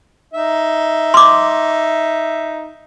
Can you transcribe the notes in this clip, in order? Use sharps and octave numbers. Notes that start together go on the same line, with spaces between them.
D#4 E5
C6 D6